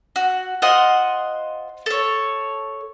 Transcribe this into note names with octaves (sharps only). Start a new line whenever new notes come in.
F#4
F4 C5 D#5 F#5
A4 C#5